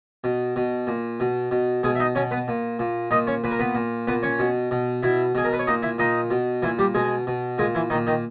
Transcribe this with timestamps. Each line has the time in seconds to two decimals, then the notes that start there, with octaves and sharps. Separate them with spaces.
0.24 B2
0.56 B2
0.87 A#2
1.20 B2
1.51 B2
1.83 B2 G#3 G#4
1.95 E5
2.00 D#4 D#5
2.15 B2 C#4 C#5
2.31 B3 B4
2.48 A#2
2.79 A#2
3.11 A#2 D#4 D#5
3.27 C#4 C#5
3.44 A#2 B4
3.51 A#4
3.59 B3 B4
3.75 A#2
4.07 A#2 B3 B4
4.23 C#4 C#5
4.39 B2
4.71 B2
5.03 B2 E4 E5
5.35 B2 G#4
5.45 A#4
5.53 B4
5.59 C#5
5.67 A#2 D#4 D#5
5.83 E4 E5
5.98 A#2 D#4 D#5
6.30 B2
6.62 A#2 E3 E4
6.79 G3 G4
6.94 B2 G#3 G#4
7.27 B2
7.58 A#2 G#3 G#4
7.75 E3 E4
7.90 A#2 D#3 D#4
8.07 D#3 D#4